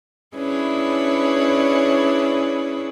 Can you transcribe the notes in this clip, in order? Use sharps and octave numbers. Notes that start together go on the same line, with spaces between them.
C#4 D4 E4 G#4 B4 C#5